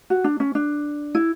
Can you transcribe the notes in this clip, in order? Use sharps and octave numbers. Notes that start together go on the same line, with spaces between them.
F#4
D4
C#4
D4
E4